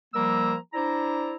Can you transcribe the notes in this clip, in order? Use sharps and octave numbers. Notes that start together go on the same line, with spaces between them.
F3 G3 A#3 A#4 A#5 E6
D4 E4 C5 D5 A#5